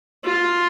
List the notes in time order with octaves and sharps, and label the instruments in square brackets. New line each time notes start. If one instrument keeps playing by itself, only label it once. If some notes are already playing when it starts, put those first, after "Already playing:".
[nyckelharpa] F4